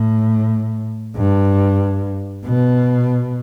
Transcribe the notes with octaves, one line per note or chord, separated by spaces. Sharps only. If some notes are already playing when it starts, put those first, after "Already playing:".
Already playing: A2
G2
B2